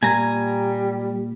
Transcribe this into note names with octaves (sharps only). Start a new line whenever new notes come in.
A#2 G3 G#5 A#5